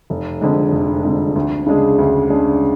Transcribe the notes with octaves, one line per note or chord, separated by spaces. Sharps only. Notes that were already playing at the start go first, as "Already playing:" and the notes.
F1
F2 D3 G#3
F1
F2 D3 G#3
D2
C#3 G#3 D4 G#4
D2
C#3 G#3 D4 G#4